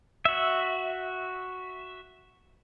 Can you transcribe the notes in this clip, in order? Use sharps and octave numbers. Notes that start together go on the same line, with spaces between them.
F#4 E5